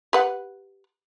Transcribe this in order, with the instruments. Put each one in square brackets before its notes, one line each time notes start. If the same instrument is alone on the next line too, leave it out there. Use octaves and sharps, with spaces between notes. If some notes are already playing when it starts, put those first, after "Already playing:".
[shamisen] G4 B4 F#5